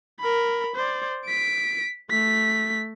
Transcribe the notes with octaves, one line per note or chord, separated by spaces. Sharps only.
A#4 B5
C5 D5
B6 D7
A3 B6